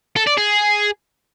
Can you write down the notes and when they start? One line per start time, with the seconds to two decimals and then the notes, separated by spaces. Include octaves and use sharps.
0.16 A4
0.27 D5
0.38 G#4